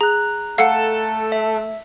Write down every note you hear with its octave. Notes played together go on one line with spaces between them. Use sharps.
G#4 A#5 F#6
A3 A4 F5 F#5
E5